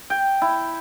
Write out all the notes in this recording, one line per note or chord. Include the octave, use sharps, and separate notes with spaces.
G5
E4